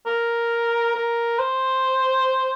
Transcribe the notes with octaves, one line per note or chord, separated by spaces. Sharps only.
A#4
A#4
C5